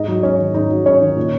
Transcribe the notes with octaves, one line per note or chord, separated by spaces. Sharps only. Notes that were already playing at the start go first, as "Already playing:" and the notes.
Already playing: G#2 D#4 D#5
F#3
G#2 C#4 C#5
D#3
G#2 D#4 D#5
F#3
G#2 C#4 C#5
D#3
A#2